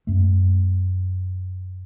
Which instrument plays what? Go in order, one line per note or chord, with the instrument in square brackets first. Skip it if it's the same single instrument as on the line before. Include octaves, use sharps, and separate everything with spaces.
[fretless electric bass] F#2 A3